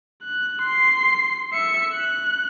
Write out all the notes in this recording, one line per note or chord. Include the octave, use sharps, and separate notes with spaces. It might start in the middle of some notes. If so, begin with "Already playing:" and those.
F#6
C6 C7
E5 C#7
F#6